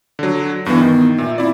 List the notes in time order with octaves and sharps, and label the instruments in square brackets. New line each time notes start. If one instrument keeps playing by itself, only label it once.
[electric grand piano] D3 F#3
[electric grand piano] G2 E3 [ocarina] B3
[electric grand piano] D#3
[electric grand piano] A#2 [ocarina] E5
[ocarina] C4 [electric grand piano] E4 D5